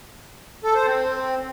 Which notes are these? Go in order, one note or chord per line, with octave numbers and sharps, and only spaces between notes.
A4
C5
C4